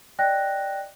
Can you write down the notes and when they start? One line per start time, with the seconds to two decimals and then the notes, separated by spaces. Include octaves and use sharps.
0.19 D5 D#5 G5 F#6 A#6